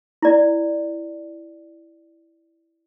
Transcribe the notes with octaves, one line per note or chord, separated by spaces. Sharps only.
E4 D5